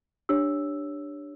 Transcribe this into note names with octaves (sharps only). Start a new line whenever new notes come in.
D4 G4 C#5 E6